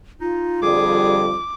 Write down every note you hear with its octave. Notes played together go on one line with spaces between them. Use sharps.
D#4 F4
F2 D3 G3 G#4 D6